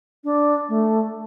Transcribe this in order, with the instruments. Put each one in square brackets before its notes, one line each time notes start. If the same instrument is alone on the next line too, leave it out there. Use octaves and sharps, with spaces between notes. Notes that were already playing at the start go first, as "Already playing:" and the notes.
[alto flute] D4
A3